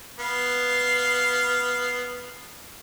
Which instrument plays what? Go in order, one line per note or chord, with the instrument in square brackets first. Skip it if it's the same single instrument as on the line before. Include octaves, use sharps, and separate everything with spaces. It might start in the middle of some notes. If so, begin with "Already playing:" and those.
[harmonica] B3 F5